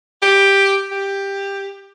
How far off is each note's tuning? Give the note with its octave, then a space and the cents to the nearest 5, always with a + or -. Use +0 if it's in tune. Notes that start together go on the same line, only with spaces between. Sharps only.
G4 +5
G4 +10